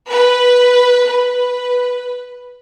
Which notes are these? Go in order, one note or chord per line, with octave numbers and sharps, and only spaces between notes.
B4
B4